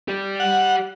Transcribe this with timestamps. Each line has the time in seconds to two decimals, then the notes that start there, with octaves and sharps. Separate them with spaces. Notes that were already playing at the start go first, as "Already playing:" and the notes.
0.08 G4 D5
0.40 F#5